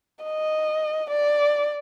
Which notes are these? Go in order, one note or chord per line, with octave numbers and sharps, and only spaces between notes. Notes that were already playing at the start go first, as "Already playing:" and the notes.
D#5
D5